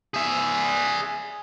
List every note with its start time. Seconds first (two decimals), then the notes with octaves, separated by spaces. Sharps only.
0.14 G#4 E5